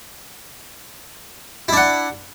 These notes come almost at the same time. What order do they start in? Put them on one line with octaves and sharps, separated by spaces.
E4 D4 F#5